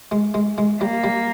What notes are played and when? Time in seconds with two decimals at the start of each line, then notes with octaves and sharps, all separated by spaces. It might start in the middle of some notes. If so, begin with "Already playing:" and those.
0.12 G#3
0.34 G#3
0.58 G#3
0.81 G3 A#3
1.04 G3